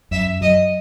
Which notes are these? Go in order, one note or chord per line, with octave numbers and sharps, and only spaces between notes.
F#2 E5
F#3 D#5